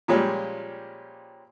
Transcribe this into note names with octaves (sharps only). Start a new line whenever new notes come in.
A#2 F3 G3 G#3 C#4 G4